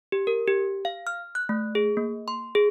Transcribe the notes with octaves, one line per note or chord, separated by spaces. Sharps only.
G4
A#4
G4
F5
F6
F#6
A3
G#4
A#3
C6
G#4